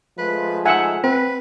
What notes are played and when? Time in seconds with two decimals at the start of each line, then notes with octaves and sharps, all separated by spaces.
0.18 F3 G#3 A3 B4
0.66 D#4 E5 F#5 G#5 E6
1.04 C4 B4